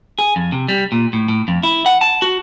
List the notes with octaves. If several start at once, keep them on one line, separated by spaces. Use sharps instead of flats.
G#4
F2
C3
G3
A#2
A2
A2
F2
E4
F#5
A5
F#4